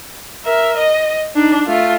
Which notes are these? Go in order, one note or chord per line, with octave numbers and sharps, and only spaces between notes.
A#4 E5
D#5
D4 D#4
A3 F4